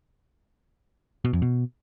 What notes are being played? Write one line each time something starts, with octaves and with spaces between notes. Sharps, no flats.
B2
F2
B2